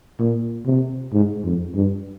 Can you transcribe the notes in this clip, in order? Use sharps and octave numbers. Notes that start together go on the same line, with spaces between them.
A#2
C3
G#2
F2
G2